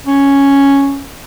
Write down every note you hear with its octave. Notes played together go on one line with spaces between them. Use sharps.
C#4